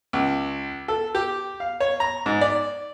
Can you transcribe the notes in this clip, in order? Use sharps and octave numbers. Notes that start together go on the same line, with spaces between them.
C#2
A4
G4
F5
C#5
A#5
G#2
D5